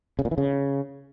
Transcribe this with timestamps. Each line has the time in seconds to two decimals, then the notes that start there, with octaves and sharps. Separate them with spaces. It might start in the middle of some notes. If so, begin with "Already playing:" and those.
0.19 C#3
0.25 A#2
0.31 E3
0.38 C#3